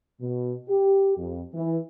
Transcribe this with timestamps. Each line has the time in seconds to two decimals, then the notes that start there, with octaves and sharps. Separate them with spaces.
0.20 B2
0.69 G4
1.17 F2
1.53 E3